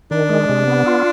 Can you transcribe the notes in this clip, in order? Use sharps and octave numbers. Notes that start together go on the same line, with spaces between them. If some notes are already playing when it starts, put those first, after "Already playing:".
D#3 D4
G#3
C3
B3
F4